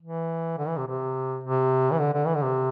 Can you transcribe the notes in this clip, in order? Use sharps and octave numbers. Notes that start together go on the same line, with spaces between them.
E3
D3
E3
C3
C3
C3
E3
D3
D3
E3
D3
C3